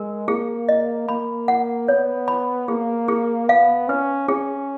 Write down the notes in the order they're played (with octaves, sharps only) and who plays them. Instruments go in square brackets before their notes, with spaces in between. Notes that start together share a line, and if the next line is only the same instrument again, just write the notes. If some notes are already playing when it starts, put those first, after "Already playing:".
Already playing: [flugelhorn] G#3 [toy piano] A#4
[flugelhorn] A#3 [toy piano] G#4
[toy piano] D#5
[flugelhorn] A#3 [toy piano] B5
[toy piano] F#5
[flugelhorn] B3 [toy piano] C#5
[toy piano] B5
[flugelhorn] A#3 [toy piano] G#4
[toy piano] G#4
[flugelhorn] B3 [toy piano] F5
[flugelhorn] C#4 [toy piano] B4
[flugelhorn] C#4 [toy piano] G#4